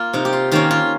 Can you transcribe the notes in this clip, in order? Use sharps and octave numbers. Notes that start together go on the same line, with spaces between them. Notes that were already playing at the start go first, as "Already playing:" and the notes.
Already playing: A#3 F4
C3 D#4
G4
F4
D#3 A#3 C#4 F4
F4